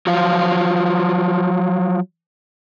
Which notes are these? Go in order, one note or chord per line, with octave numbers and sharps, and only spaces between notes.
F3 F#3 F4